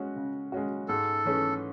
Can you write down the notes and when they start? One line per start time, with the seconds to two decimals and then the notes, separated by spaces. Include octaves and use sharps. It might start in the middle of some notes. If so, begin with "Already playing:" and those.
Already playing: G#3 C#4 F#4
0.16 C#3
0.52 G#3 C#4 F#4
0.88 G#2 A4
1.25 E3 A3 C#4 G#4